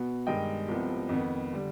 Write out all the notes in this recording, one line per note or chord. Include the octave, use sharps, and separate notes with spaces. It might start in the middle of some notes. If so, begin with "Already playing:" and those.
Already playing: B2 B3
G2 D#3 G#3 D#5 G5
C2 C3 F3 B3
F2 D#3 B3
D3 G3